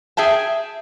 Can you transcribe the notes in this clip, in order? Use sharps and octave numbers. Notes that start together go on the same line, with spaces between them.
G#4 E5 G5 A5